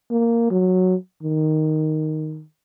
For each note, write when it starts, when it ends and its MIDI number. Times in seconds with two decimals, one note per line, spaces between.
0.11 0.49 58
0.51 0.95 54
1.23 2.44 51